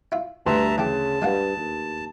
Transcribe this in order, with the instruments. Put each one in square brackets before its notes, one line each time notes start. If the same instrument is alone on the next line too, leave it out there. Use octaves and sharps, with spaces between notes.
[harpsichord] E4 F4
[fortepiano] D2 B4 C6 [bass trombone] G2 [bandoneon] E5 A5 A#5
[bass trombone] C#3 [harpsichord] E3 G4 [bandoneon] A5
[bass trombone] G2 [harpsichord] G#3 F4 F#5
[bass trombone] D#2